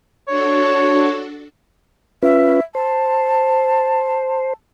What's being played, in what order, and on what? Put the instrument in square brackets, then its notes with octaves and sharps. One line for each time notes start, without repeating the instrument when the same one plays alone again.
[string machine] D4 F#4 A4 [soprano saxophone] C#5
[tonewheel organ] C#4 F4 B4 [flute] E5
[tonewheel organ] C5 [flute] A5